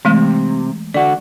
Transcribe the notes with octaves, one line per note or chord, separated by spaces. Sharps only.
C3 E3 G#3 A3
D3 F#4 D5